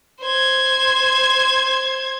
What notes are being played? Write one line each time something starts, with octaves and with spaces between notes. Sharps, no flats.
C5 G#6